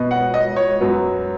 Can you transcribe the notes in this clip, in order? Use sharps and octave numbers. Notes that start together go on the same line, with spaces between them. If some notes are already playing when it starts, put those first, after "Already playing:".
Already playing: B2 B3 D#5
F#5
D#5
C#5
F#2 F#3 B3